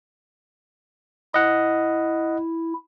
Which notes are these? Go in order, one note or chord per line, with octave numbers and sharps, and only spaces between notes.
E4 D#5 F#5